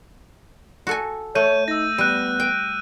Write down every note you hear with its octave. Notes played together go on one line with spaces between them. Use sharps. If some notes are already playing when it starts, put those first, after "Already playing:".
F#4 A4 G#5
A3 C#5 G6 D#7
D#4 E6 A#6
G3 B3 F#6 D#7
G5